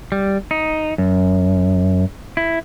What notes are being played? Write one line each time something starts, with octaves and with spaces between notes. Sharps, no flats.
G3
D#4
F#2
E4